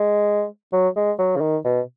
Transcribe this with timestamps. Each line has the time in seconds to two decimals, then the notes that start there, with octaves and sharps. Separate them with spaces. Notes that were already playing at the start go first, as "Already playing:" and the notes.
Already playing: G#3
0.73 F#3
0.96 G#3
1.19 F#3
1.36 C#3
1.41 D#3
1.65 B2